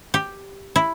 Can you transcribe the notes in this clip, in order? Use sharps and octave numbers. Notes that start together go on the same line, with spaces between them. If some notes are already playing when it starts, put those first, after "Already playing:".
G4
E4